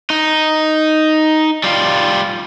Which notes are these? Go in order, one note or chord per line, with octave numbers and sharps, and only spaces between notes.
D#4
G3 F4